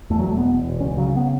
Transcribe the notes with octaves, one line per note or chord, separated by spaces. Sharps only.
E2 A3
F#3
E1 A3
B3
E1
E1
C#2 C#4
C#3 F#3
B3